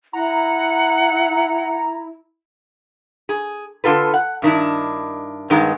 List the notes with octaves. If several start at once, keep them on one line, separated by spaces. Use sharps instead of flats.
E4 F#5 A#5
G#4
D3 F4 A4 B4
F#5
G2 D#3 D4 E4
G2 D#3 G#3 B3